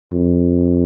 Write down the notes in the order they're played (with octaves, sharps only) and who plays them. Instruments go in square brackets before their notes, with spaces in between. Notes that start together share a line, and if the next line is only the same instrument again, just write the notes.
[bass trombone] F2